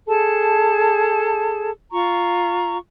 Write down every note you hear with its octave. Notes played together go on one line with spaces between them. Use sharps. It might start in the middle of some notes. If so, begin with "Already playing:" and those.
G#4 A4 A5
F4 A#5 C#6